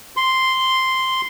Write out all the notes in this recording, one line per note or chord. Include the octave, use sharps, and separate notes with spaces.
C6